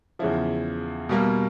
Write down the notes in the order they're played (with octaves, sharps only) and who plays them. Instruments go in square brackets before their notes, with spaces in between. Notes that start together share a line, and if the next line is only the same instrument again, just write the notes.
[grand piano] E2 C#3 F3 E4
B2 G3 A#3